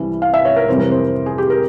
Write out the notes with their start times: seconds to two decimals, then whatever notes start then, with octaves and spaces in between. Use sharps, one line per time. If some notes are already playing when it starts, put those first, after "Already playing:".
Already playing: C2 C3 E3 G3
0.22 F5
0.34 E5
0.45 C#5
0.56 A#4
0.68 F2 C3 E3 G3 C4 C5
0.79 A#4
0.91 C5
1.26 G#4
1.38 G4
1.50 A#4